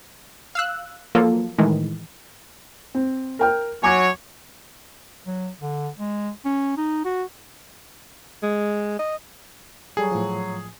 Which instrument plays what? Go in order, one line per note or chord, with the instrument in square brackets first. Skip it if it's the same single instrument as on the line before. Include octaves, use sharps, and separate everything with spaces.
[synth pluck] F5 E6 F#6
F3 F#3 A#3 F4 A4
A2 D#3 E3 G#3
[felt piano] C4
A#4 G5 F6
[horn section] F#3 C#5 [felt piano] G#5 D6
[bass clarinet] F#3
D3
G#3
C#4
D#4
F#4
[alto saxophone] G#3
D#5
[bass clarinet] F#3 [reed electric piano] G3 A4 [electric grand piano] G#4
[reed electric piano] A2 F3